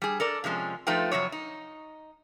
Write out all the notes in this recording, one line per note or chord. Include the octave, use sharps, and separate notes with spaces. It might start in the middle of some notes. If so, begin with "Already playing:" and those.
G3 G#4
A4 A#4 D5
C3 F3 G#3 C#4
F3 A3 D#4 F4 B4 G5
F2 C3 F#3 C#5
D#4